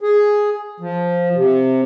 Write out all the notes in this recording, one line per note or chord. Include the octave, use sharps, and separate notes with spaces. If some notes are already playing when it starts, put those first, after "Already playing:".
G#4
F3
C3